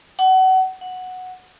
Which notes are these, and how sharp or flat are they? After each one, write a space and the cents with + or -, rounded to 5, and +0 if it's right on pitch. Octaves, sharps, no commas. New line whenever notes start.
F#5 +30
F#5 -5